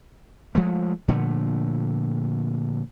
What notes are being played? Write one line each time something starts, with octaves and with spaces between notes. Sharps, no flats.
F3 G#3 A3
A#2 D3 F3 A3